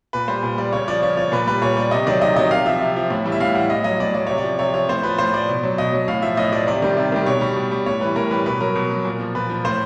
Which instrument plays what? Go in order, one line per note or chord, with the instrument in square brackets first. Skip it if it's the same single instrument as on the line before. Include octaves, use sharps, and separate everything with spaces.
[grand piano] A#2 B4
G3 C5
A#2
G3 D5
C#3 C#5
F3 D5
C#3 C#5
F3 C#5
A#2 B4
G3 B4
A#2 C#5
G3 D5
C3 D#5
D#3 F#3 D5
C3 D#5
D#3 F#3 D#5
C3 F5
F3 E5
C3
F3
A2
E3 G3
E5
A2 F5
E3 G3 F#5
A2 D#5
F#3 D#5
A2 D5
F#3 D5
C3 C#5
D5
F3
C3 C#5
F3 C#5
A2 C5
F3 B4
A2 C5
F3 D5
B2
F#3
B2 D#5
F#3
A2 F5
F3 E5
A2 D#5
F3 D5
C3 D5
D#3 G3
C3
D#3 G3
B2 C#5
G3
B2
G3
A2 C#5
E3 G3 B4
A2 A#4
E3 G3 B4
B2 B4
F#3 A#4
B2
F#3
A#2
F3
A#2 B4
F3
A2 C5